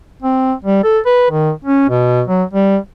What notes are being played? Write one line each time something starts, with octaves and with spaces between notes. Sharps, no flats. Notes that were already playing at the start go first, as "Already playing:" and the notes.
C4
G3
A4
B4
D#3
C#4
B2
F#3
G3